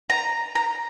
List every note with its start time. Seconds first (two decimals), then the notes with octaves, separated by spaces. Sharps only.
0.10 A#5
0.55 A#5